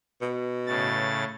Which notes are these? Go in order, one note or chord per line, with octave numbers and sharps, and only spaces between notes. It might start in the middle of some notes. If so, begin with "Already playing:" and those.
B2
A2 C#3 A6